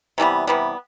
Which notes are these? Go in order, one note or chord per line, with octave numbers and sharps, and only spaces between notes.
C3 E3 G3 B3
C3 E3 G3 B3